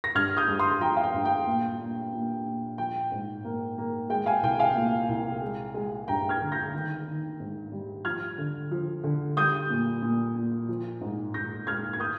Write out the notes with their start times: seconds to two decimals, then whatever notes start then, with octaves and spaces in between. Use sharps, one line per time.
0.04 A#6
0.15 G2 F6 G#6
0.37 D#6 G6
0.48 G2
0.59 C6 D#6
0.80 F3 G5 A#5
0.97 F5
1.04 G5
1.14 G2
1.25 G5
1.47 A#2
1.79 A#2
2.13 A#2
2.45 A#2
2.78 F3 G5
3.12 G#2
3.44 A#3
3.78 A#3
4.10 G#3 G5
4.26 F5 G#5
4.43 C2 G5
4.59 F5 G#5
4.75 A#2
5.09 C2
5.41 G#3
5.74 G#3
6.08 G2 G5 A#5
6.29 F6 G#6
6.41 D3
6.52 G6 A#6
6.73 D#3
7.07 D#3
7.40 G#2
7.72 G3
8.05 F3 F6 G#6
8.38 D3
8.71 F3
9.04 D3
9.37 G3 D#6 G6
9.70 A#2
10.02 A#2
10.36 A#2
10.69 F3
11.01 G#2
11.34 G#2 G6 A#6
11.67 G#2 F6 G#6
11.93 G#6
12.00 D#6 G6